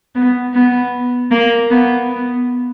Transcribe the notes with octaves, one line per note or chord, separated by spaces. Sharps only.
B3
B3
A#3
B3
B3